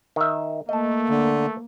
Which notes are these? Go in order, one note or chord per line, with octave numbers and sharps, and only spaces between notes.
D#3 E5
A3 A#3 D#5 A5
D3